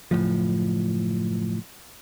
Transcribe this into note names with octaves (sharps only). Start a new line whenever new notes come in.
F#1 C2 A2 F3